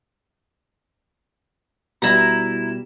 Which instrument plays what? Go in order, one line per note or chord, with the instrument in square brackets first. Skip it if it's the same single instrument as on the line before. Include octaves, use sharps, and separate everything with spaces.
[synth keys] B2 G3 E7 [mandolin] E4 A#5